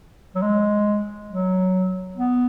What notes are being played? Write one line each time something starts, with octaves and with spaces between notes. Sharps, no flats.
F#3
G#3
F#3
B3